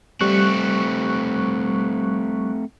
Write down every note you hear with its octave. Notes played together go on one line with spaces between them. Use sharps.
G3 A3 C4 C#6 F#6